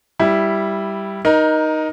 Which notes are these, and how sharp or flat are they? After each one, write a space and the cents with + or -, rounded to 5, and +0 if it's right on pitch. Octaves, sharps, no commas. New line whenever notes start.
G3 +0 E4 +0
D#4 +0 A#4 +25